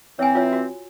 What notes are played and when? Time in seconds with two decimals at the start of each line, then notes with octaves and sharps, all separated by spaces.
0.19 E3 C4 C#5 G#5
0.35 F4 C#5
0.53 F#4